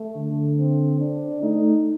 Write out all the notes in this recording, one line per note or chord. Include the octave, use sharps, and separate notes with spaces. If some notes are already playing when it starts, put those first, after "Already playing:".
Already playing: A3
D3
C4
D4
A3 D#4